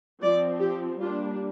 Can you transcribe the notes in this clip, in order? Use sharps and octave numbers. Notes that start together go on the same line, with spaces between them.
F3 C4 D5
G4
G3 A#3 D4 F4